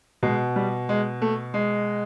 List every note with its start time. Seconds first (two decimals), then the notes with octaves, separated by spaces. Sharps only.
0.23 B2 G#3
0.56 G3
0.89 G#3
1.22 A3
1.54 G#3